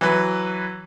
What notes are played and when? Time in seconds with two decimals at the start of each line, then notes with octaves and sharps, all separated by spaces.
0.01 E3 F#3 B4